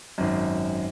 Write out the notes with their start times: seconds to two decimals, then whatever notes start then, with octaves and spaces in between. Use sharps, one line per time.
0.18 G#1 F#2